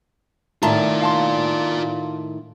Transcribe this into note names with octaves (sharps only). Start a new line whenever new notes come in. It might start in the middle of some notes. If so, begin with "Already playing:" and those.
A2 D#3 F4 D5 E5 A5 A#5
F5 A5 C6